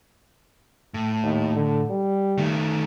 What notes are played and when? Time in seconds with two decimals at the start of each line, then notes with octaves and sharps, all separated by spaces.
0.94 A2
1.23 D#2
1.56 D3
1.90 G3
2.38 D#3 A3